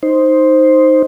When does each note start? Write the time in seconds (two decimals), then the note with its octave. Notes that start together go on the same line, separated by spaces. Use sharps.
0.03 D#4 C5